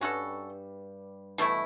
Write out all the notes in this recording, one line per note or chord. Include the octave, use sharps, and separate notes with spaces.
G2 G3 C#4 F#4 A4
B2 E3 A3 E4